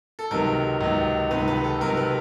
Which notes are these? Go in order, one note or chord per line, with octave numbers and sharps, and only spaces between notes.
A4
C#2 C3 D#3 F#3 B3 A#4
C#2 C3 D#3 F#3 B3
C#2 C3 D#3 F#3 B3 B4
B4
A4
C#2 C3 D#3 F#3 B3 A#4
B4